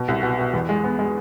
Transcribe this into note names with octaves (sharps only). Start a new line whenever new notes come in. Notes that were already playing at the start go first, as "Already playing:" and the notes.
Already playing: B2
C2
B2
B2
E2
G#3
B3
G#3